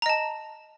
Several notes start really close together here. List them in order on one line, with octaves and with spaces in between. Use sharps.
A#5 D#5 A5